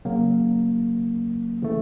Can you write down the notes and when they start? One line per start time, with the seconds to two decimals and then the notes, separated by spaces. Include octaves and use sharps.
0.05 C#3 F#3 A#3
1.62 C#3 E3 A3